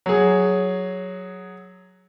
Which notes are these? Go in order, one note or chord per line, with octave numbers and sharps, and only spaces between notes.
F#3 G#4